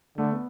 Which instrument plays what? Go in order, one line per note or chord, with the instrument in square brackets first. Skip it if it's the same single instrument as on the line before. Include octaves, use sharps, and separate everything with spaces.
[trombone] D3 [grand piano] A3
[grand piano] B3